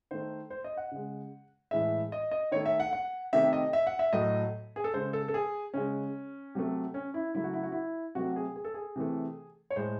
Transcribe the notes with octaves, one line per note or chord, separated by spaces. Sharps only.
D#3 A3 C5
C5
D#5
F#5
C#3 G#3
A2 E3 G#3 E5
D#5
D#5
D#3 A3 C#5
E5
F#5
F#5
C3 D#3 A3 E5
D#5
E5
F#5
E5
A2 F#3 A3 D#5
G#4
A4
C#3 G#3 C5
A4
A4
G#4
C#3 G#3 C#4
C3 F#3 A3
C#4
E4
C#3 F#3 A3 E4
F#4
E4
F#4
E4
C3 F#3 A3 F#4
G#4
G#4
A4
G#4
C3 E3 A3
C#5
A2 G#3 C5